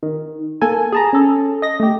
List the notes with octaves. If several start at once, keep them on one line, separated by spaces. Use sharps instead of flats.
D#3
A#3 A4 G#5
G#4 A5 A#5
C#4 A4
D#5 A#6
A3 G4